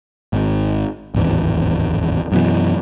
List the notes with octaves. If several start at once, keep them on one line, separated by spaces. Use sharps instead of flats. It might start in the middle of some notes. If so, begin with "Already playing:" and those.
G#1
D1 G#1 E2
F#2 B2 E3